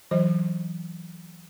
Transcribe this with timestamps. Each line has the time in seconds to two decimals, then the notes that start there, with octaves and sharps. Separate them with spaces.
0.11 E3 F#3 C5